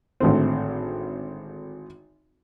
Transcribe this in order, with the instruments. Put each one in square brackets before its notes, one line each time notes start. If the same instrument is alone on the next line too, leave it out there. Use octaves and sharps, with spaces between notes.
[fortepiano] G#1 A2 D3 C4